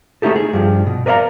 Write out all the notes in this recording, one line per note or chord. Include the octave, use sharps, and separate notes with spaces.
A3 D#4 E4 G4 A4
G#4
G2 F3
B2
A#4 B4 D5 D#5 F5 A#5